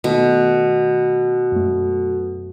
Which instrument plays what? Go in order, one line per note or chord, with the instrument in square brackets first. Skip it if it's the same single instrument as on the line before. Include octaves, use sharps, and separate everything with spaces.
[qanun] B2 [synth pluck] D#3 A3 B3
[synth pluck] F#2 A3